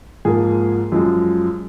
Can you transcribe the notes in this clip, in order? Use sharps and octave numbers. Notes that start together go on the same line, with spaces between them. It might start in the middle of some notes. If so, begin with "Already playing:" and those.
G#2 F3 A#3 G#4
F#2 F3 G#3